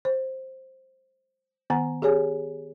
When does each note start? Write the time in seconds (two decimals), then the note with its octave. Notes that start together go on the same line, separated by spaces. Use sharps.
0.05 C5
1.70 D#3 B3 F#5 A#5
2.02 G4 G#4 C#5 G#5